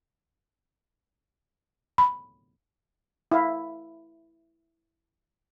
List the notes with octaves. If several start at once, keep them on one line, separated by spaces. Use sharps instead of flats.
B5
E4 F5